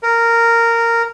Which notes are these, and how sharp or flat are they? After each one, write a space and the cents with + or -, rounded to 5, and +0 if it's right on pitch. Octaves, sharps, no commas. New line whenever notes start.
A#4 -10